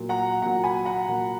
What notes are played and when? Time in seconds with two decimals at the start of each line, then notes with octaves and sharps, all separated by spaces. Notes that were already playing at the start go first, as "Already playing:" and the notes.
Already playing: A#2 F#3
0.09 F#5 A#5
0.42 A#2 F#3 F#5 A#5
0.63 G#5 B5
0.85 F#5 A#5
1.07 A#2 F#3